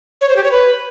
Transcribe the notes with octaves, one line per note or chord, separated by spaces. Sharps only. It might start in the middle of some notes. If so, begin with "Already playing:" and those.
C#5
C5
G4
C#5
B4